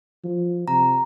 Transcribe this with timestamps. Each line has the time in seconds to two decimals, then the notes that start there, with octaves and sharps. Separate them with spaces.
0.25 F3
0.68 C3 A#5